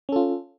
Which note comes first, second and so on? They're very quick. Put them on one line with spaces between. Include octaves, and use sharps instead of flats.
C#4 A4 F4